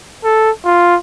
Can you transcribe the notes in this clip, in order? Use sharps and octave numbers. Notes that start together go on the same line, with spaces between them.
A4
F4